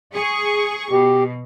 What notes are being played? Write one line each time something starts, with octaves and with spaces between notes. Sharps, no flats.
G#4 C#6
B2 G4